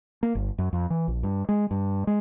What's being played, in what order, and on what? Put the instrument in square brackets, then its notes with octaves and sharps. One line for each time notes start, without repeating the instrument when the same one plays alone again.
[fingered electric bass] A#3
G1
F#2
F2
E3
A#1
G2
G#3
G2
G#3